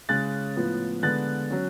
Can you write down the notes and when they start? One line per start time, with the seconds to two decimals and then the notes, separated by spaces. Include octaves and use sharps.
0.09 C#3 G#3 C#4 F#6 A6
0.56 A2 F3 B3
1.03 D3 G#3 B3 F#6 A6
1.50 F#3 C#4